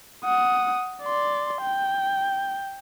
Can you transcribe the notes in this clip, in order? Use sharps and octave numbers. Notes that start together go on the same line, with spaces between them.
F#5 D#6
D5 C6
G5